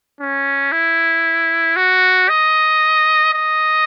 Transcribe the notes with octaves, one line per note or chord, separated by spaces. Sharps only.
C#4
E4
F#4
D#5
D#5